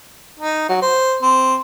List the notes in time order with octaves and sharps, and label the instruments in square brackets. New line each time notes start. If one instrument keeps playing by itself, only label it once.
[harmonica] D#4
F#3
C5
C4